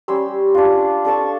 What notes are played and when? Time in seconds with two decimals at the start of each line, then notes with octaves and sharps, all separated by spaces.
0.08 G3 C#4 C6 E6
0.55 D4 F4
1.05 D4 A4 A5 C#6